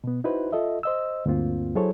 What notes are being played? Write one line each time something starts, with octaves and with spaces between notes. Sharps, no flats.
B2 B3
D#4 E4 F#4 B4 C5
F4 A4 D#5 E5
C5 D#5 E6
D2 G2 A#3 C4 F4
F#3 E4 G#4 A4 C5 C#5